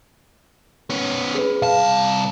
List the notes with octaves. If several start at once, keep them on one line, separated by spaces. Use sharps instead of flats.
B3 C#4
G#4 B4
C2 F5 A5